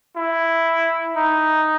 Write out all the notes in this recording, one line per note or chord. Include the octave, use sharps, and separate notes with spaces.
E4
D#4